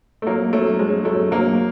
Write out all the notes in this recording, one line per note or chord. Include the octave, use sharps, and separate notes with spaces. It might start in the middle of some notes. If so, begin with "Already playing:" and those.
A3
F#3 A#3
F#3 A3
F#3 G#3
F#3 A3
F#3 A#3